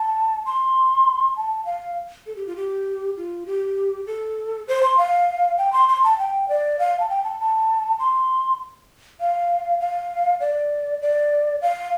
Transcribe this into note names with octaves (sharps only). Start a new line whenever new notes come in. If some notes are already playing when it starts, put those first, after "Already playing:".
Already playing: A5
C6
A5
F5
A4
G4
F4
G4
F4
G4
A4
C5
C6
F5
G5
C6
C6
A5
G5
D5
F5
A5
G5
A5
A5
C6
F5
F5
D5
D5
F5